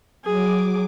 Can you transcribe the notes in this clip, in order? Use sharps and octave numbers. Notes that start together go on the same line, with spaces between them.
F#3 G#4 D6